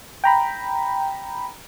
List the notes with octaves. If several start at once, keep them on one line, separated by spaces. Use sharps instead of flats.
G5 A#5 B5